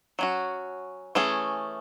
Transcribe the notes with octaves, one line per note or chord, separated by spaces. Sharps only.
F#3 C#4 F#4
E3 A3 C#4 G#4